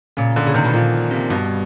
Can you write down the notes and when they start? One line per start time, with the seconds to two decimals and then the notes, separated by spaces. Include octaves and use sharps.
0.17 A#2 C#3
0.36 D3
0.47 C#3
0.54 C3 D#3
0.65 B2
0.74 A#2 F3
1.11 C3
1.30 G2 B2